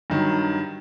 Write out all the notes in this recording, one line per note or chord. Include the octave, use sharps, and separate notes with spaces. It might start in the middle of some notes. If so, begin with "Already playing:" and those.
G2 D#3 F#3